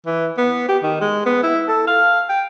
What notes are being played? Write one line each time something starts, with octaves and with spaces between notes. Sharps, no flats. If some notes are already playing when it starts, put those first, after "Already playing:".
E3
B3
G4
D#3
G#3
B3
E4
A4
F5
G5